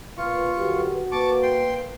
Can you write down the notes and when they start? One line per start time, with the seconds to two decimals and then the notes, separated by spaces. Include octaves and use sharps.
0.18 A#2 F4 B4 C#6
0.57 F#2 D3 F#4 G4
1.12 A#3 B4 A5 C#6 D6
1.43 G5 C6